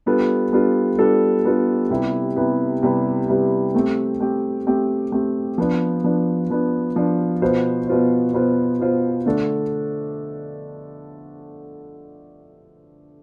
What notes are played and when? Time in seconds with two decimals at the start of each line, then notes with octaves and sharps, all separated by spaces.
0.06 G3 B3 D4 F4 A4
0.53 G3 B3 D4 F4 A4
0.98 G3 B3 D4 F4 A4
1.44 G3 B3 D4 F4 A4
1.90 C3 G3 B3 E4
2.36 C3 G3 B3 E4
2.83 C3 G3 B3 E4
3.28 C3 G3 B3 E4
3.74 A3 C4 G4
4.20 A3 C4 G4
4.67 A3 C4 G4
5.12 A3 C4 G4
5.58 F3 B3 D4
6.04 F3 B3 D4
6.50 F3 B3 D4
6.96 F3 B3 D4
7.42 B2 B3 F4 C5
7.87 B2 B3 F4 C5
8.33 B2 B3 F4 C5
8.80 B2 B3 F4 C5
9.26 D3 A3 D4 A4